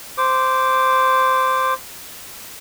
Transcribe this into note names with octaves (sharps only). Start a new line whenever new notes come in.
C5 D6